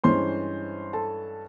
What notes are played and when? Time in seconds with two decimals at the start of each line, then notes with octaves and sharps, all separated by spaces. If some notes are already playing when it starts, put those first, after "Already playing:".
0.04 G2 E3 G#3 C#4 C5 C6
0.93 A4 A5